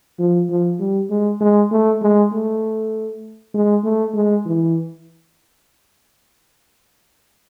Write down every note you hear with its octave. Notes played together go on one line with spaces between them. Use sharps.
F3
F3
G3
G#3
G#3
A3
G#3
A3
G#3
A3
G#3
E3